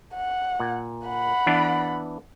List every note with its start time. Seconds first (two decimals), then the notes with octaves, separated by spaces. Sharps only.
0.15 F#5
0.60 A#2
1.06 F#5 B5
1.47 E3 B3 D4